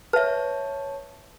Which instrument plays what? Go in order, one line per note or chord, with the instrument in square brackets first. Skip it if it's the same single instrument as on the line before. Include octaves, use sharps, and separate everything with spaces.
[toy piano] B4 E5 [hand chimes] C#5 A5